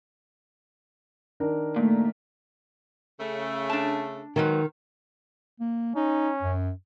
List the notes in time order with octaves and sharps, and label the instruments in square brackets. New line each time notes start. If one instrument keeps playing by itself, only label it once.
[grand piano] D#3 D4 A#4
[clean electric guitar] A#2 [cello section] A3
[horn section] C#3 A3
[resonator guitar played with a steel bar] D4 A5
[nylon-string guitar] D#3 [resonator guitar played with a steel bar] F#3 G#3 B4
[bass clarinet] A#3
[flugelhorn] C#4 [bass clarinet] D#4
[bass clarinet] F#2